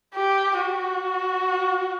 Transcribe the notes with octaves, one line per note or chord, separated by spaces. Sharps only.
G4
F#4